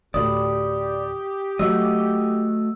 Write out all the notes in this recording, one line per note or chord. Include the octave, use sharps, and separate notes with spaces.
D2 A2 G4 D5 B5 D#6
F#3 A3 F#4 D#5 E6